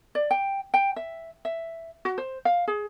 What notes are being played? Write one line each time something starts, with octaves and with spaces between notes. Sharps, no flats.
D5
G5
G5
E5
E5
F#4
C5
F5
G#4